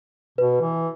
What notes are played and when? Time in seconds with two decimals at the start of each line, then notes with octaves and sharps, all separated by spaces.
0.38 B2 B4
0.61 E3